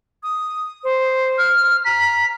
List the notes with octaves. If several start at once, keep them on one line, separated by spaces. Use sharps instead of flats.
D#6
C5
F6
A#5 B6